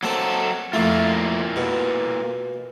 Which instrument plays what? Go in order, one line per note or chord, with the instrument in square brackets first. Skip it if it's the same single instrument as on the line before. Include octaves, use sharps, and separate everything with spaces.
[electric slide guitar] F#3 A4 [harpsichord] A#3 C4
[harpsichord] F2 A3 [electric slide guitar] A#3 E4 F4
[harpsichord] B2